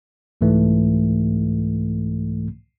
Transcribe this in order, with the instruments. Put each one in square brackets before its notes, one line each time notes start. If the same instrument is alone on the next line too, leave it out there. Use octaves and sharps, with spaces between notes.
[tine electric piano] C2 G#2 E3 A3